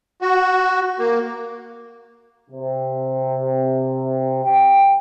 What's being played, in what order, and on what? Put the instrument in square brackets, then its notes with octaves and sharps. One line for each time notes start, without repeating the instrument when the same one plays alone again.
[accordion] F#4
A#3
[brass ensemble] C3
G5